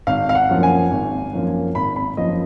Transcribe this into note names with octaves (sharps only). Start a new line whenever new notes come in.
G#1 F5
F5
F#5
F#2 F3 A#3
G#5
G#1
F#2 F3 A#3
G#1 B5
B5
F#2 F3 A#3 D#5